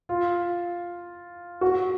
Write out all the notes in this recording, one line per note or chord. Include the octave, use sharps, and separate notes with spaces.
F4
F#4